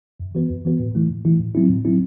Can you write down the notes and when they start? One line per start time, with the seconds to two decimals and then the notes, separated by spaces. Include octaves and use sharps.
0.20 F#2
0.35 E3 B3 F#4 B4
0.50 F#2
0.65 E3 B3 F#4 B4
0.80 A2
0.95 E3 A3 E4
1.10 A2
1.25 E3 A3 E4
1.40 A2
1.55 F#3 C4 E4
1.70 A2
1.85 F#3 C4 E4